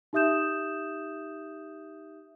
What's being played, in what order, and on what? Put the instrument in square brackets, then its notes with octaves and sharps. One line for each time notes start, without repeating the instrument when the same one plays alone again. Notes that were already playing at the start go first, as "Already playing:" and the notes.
[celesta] D#4 G4 E5 D#6 G6 E7